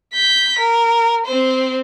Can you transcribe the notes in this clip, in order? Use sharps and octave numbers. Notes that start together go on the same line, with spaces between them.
G6 B6
A#4
C4 C5